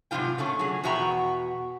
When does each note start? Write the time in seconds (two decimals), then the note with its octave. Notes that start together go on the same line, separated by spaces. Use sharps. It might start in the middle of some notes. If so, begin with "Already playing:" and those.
0.11 G#2 C3 F#3 G3 F4 G5
0.38 C#3 A3 C#4 D4
0.59 F#3 G#4
0.83 E2 B2 F#4 E5 G5 A#5